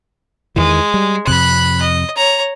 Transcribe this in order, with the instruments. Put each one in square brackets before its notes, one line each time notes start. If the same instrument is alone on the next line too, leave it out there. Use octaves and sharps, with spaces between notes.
[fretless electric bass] E2 D#3 E3 [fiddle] G#3
[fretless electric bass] G3
[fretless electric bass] F2 C3 [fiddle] B5 F#6
[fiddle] D#5
C#5 A#5